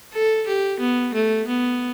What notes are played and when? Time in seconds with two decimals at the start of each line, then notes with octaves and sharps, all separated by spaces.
0.13 A4
0.47 G4
0.80 B3
1.14 A3
1.47 B3